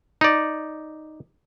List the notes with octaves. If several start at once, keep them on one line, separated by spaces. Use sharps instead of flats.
D#4 D5